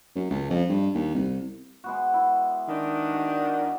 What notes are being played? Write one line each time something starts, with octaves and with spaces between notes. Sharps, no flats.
F#2
C#2
F2
G2
D#2
C2
G#3 B3 F#4
E4
D#3 D4
F#4